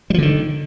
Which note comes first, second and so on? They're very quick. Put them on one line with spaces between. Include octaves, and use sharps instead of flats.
G3 F3 D3 D#3